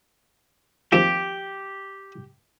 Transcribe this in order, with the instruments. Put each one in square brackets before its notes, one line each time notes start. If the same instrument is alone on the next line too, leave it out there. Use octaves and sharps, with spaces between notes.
[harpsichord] D#2 F3 C4 [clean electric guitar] G4